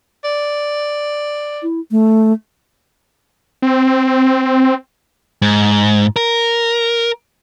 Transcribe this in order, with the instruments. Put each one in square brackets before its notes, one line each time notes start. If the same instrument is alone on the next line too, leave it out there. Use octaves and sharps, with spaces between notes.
[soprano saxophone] D5
[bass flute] E4
A3
[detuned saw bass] C4
[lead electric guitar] G#2
A#4